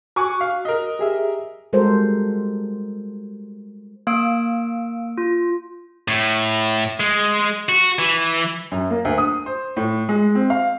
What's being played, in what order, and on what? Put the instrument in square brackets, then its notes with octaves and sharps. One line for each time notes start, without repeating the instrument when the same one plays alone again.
[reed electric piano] F#4 F#6 [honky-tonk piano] G#5 C#6 D6
[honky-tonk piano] F5
A#4 D#5
[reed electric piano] G4 G#4 E5
[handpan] G3 G#3 F#4 A4 A#4 C5
[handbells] A#3 F5 E6 D7
F4
[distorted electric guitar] A2
G#3
F#4
E3
[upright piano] F#2
A#3
D2
D#6
C5
A2
G#3
C4
F5